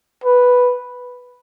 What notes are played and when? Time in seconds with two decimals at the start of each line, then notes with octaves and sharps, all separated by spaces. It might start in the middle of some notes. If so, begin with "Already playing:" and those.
0.24 B4